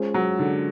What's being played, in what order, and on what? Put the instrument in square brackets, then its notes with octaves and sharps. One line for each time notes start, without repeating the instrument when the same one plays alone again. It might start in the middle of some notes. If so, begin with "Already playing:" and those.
Already playing: [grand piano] G#3 C#4 F4 G#4 C5
[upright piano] F#3
D3